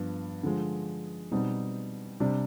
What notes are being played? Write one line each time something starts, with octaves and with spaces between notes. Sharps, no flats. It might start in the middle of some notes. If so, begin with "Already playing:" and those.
Already playing: G2 F3 B3
D3 F3 G#3
B2 G3 C4 D#4
C3 G3 D4